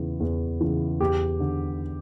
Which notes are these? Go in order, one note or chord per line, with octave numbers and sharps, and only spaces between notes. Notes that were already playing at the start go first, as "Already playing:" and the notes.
Already playing: E2 C#3 E3
E2
C#3 E3
E2 G4
D3